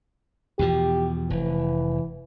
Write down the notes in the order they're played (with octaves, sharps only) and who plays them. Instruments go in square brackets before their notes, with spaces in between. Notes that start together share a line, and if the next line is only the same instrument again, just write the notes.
[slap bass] E2 B2 F3 [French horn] G4
[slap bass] F1 [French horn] E3